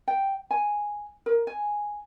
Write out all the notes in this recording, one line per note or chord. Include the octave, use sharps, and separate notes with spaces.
G5
G#5
A#4
G#5